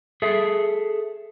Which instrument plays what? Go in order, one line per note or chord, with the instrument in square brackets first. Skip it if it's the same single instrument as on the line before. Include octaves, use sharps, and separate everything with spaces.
[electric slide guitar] G#4 A4 E5